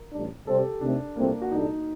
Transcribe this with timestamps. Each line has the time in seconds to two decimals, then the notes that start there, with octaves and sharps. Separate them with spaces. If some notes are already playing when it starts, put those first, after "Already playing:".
Already playing: A#4
0.12 A1 A2 G3 D4
0.47 C3 G3 C4 A4
0.58 G4
0.81 C3 D#3 A3 C4 D4
1.16 C2 A#2 A3 A#3 C4
1.42 F#4
1.51 C2 A#2 G3 D4 D#4 A4